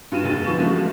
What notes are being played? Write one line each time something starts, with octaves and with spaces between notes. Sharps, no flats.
G2 F4 D#7 E7
F1 D#2 D3 G#4 A6 D#7
F3 B3 C#6 A6 E7
C#3 E3 F3 G#3 A3 F#4